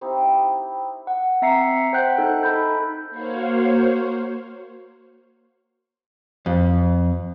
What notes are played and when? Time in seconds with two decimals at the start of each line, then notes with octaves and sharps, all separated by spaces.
0.01 C4 D#4 E4 G4
1.07 F#5
1.42 C4 E5 A#5 C7 C#7
1.93 C5 F#5 G5 F#6 G6 B6
2.18 D#4 A4
2.43 D#4 A4 B5 G6
3.10 A#3 F#4 C5 C#5 F5
6.46 F2